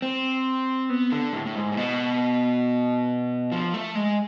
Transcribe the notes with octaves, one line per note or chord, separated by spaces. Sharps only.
C4
B3
D3
A2
A2
G#2
A2
B2
F3
A3
G#3